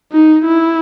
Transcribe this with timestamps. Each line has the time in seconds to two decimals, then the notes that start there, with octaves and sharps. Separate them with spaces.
0.13 D#4
0.45 E4